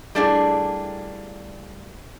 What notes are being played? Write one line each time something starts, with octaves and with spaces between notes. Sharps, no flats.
G3 A3 A#3 D4 E4 G#4